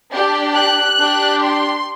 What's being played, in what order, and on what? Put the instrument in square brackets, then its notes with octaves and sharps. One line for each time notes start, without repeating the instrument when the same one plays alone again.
[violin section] D4 G4
F#6
D4 G4
C6